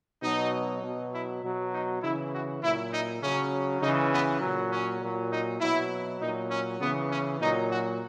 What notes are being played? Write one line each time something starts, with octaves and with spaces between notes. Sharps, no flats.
B2 F#3 D#4
B2 F#3
E4
B2 F#3
D#4
C#3 E3 E4
F#4
A#2 F#3 E4
D#4
C#3 F#3 C#4
C#3 E3 D#4
B3
A#2 F#3
C#4
A#2 F#3
D#4
B2 F#3 E4
A#2 F#3 D#4
C#4
C#3 E3 B3
C#4
A#2 F#3 D#4
F#4